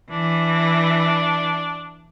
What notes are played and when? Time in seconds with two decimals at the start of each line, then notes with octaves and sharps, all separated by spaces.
0.11 E3 D4